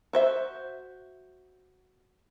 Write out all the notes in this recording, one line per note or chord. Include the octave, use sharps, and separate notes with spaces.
F#4 C5 E5